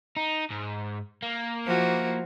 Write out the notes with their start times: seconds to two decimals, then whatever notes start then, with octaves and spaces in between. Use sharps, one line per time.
0.17 D#4
0.50 G#2
1.22 A#3
1.66 F3 E4 F#4